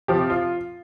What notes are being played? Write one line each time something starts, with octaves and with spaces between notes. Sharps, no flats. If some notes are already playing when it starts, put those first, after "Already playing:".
C3 F3 G4
F4